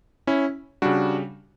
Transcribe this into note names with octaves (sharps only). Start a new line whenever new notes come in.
C#4 E4
C#3 G3 D4 F#4